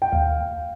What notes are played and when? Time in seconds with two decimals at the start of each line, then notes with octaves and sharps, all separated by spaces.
0.02 G5
0.12 D#2 F5